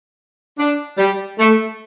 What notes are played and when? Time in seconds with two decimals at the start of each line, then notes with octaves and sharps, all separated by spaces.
0.58 D4
0.98 G3
1.38 A3